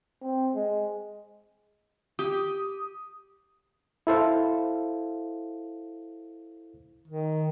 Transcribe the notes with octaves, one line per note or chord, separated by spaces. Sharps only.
C4
G#3
G4 D#6
E4 A4 C5 F5
D#3